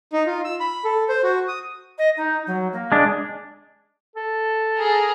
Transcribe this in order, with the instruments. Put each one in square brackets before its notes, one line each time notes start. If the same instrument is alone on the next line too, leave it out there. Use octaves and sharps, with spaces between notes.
[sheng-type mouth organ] D#4
F4
E6
B5
A4
C5
F#4
D#6
[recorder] D#5
D#4
F#3
A#3
[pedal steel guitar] G#3 D4
[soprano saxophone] A4
[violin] G#4 A#4